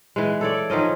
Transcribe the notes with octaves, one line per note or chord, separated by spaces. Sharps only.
E3 G#3
A4 C#5 D5
D#3 F3 C#4 D#5